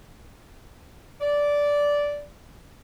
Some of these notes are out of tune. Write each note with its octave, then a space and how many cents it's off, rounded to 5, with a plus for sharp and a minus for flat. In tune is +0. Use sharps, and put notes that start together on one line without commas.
D5 -10